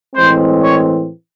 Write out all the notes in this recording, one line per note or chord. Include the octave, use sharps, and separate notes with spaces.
A2 E3 G#3 C4 C5
C#5